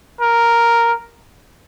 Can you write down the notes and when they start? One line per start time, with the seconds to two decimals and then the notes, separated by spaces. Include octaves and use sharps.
0.21 A#4